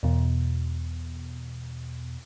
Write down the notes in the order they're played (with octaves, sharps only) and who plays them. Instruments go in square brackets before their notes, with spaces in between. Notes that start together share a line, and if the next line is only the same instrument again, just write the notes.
[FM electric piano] E2 B2